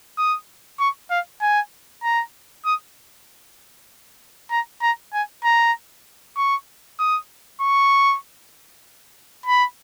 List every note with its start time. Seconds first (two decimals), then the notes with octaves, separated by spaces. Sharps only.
0.18 D#6
0.80 C#6
1.10 F5
1.41 G#5
2.03 A#5
2.65 D#6
4.51 A#5
4.82 A#5
5.13 G#5
5.44 A#5
6.37 C#6
6.99 D#6
7.61 C#6
9.46 B5